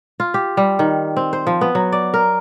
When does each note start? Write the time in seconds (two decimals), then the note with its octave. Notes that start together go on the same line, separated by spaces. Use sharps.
0.20 F4
0.34 G4
0.57 G3
0.79 D#3
1.16 C4
1.33 C5
1.47 F3
1.61 B3
1.75 F#3
1.92 D5
2.14 A#4